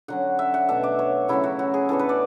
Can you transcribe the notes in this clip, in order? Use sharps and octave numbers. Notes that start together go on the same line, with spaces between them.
D3 F#3 C#4 F#5
E5
F#5
B2 A3 D4 E5
D5
C#5
C#3 F#3 A3 C#4 E4
F#4
F#4
G#4
A2 E3 B3 D4 A4
B4
D5